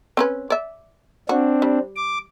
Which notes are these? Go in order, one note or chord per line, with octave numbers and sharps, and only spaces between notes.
C4 C#4 B4
D5 E5
C4 D4 F#4
G3
D6